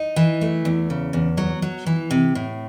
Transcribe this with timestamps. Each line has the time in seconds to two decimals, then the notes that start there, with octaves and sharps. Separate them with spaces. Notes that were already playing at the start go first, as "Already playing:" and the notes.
Already playing: D#4
0.16 E3
0.41 A3
0.65 E2
0.90 C#3
1.13 E2
1.38 F#3
1.62 F#3
1.87 E3
2.11 C3
2.35 A2